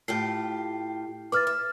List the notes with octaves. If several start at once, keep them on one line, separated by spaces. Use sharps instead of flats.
A2 F4 G4 C7
B4 E5 D6 F6 A6
E5